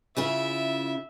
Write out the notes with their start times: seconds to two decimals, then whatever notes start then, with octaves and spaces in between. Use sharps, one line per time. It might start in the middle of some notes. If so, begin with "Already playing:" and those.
0.17 C#3 E4 F4 E5